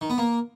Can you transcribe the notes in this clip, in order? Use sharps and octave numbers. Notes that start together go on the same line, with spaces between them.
D#3
B3
A#3